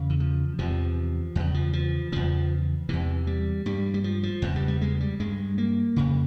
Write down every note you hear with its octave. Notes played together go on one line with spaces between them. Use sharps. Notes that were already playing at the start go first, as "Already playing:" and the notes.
Already playing: E2 C#3
E3
F3
E2 C3 F3
E2 C#3
F3
F3
E2 C#3 F3
E2 C3 E3
G3
G2 G3
G3
F3
F3
E2 C#3
G3
G3
G#3
G3
G2 G#3
A#3
F2 C#3